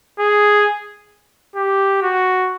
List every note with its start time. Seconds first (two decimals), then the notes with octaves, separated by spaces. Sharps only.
0.19 G#4
1.56 G4
2.02 F#4